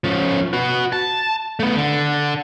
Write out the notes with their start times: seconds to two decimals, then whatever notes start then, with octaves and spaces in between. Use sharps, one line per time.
0.04 F3 C#4
0.53 F#4 B4
0.93 A5
1.60 A3 B3
1.76 D3